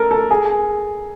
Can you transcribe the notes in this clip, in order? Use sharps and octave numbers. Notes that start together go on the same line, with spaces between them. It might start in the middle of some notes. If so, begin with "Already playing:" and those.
Already playing: A4 A#4
A4
G#4